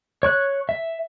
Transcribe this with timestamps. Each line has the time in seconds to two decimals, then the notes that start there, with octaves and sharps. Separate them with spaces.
0.23 C#5 C#6 F#6
0.69 E5